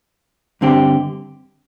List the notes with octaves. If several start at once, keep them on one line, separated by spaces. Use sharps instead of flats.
G2 D3 C4 G4